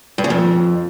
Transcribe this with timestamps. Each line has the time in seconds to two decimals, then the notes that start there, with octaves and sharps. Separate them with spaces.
0.18 G2
0.24 C#3
0.30 F2